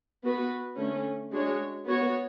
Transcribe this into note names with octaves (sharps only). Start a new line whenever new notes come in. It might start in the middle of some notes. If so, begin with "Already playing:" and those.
B3 F#4 B4
D3 A3 C#4
G#3 D4 F#4 C#5
B3 F#4 C#5